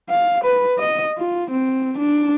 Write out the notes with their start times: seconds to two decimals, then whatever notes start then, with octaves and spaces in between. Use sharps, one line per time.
0.10 F5
0.44 B4
0.78 D#5
1.18 F4
1.51 C4
1.98 D4